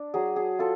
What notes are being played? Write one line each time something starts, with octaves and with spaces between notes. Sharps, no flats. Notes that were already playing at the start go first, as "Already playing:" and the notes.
Already playing: D4
F#3 G#4
G#4
F4 A4